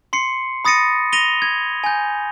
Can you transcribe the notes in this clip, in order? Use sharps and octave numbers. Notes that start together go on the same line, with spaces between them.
C6 C7 C#7
B5 D#6 A6 A#6 C#7 D#7
A#6 D#7 F7 G7
G#6
G#5 G6